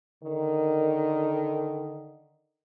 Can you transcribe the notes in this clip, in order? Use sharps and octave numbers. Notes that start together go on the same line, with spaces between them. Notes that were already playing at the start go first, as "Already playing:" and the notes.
D3 D#3